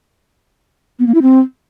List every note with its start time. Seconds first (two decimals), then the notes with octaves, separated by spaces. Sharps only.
0.99 B3
1.07 A#3
1.14 E4
1.22 C4